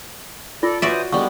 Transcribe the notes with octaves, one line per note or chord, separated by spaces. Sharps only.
F4 A4 D5
E3 F#4 C5 D5 E5 D#6
D3 G3 G#3 B3 C#6